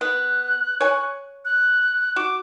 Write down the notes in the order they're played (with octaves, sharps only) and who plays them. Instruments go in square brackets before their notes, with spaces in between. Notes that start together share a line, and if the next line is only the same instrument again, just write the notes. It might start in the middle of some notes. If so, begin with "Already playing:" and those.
[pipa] B3 [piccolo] F#6
[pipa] C#5 G#5
[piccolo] F#6
[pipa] F#4 [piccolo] D6